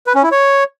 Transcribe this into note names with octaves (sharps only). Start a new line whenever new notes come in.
B4
C#4
E4
C#5